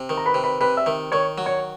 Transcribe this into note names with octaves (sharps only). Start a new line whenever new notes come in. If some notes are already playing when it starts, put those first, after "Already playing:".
Already playing: C3
D#3
A#5
B4 B5
C3
B4 B5
C3 B4 B5
E5 E6
D#3
D#3 C#5 C#6
F#3
C#5 C#6